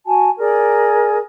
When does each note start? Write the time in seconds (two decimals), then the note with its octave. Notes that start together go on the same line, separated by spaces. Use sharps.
0.06 F#4 G#5 A5
0.39 G#4 A#4 D5